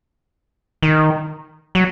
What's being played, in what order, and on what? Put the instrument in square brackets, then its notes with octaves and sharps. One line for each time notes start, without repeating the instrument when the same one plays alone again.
[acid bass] D#3
F#3